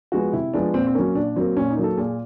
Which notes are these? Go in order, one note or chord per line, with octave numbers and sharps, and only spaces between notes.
F3 G#3 B3 F#4
C3 E4
F3 G#3 B3 D4
A#2 C4
C4
F#3 A#3 C#4
A#2 D4
F#3 A#3 C4
A#2 C#4
D#4
F#3 A#3
A4
A#2 G#4